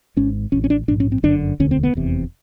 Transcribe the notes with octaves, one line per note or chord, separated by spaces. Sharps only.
G#1 G#2 C#4
A1 A2 C#4
C#4
D4
A#1 G#2 D4
C#4
C4
G1 F#2 D3 D4
E1 D2 D3 C#4
C4
B3
F1 E2 C3